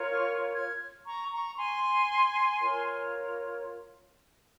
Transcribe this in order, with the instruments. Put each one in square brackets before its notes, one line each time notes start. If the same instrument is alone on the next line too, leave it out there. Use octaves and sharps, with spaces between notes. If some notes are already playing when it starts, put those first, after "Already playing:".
Already playing: [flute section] F4 A#4 C#5
C#6 F6
F6 G#6
A#5 C#6
A#5 C#6
G#5 C6
F4 A#4 C#5